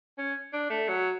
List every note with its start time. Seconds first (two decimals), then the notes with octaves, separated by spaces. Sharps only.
0.18 C#4
0.53 D4
0.70 A3
0.88 F#3